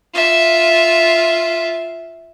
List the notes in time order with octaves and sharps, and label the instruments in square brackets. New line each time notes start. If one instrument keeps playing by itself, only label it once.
[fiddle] F4 E5